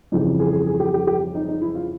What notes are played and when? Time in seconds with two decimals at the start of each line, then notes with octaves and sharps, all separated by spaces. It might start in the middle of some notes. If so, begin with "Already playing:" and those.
0.12 F2 C#3 E3 G3 D#4
0.40 G#4
0.53 G#4
0.67 G#4
0.80 G4
0.94 G4
1.07 G4
1.35 D#4
1.48 D#4
1.62 E4
1.75 F4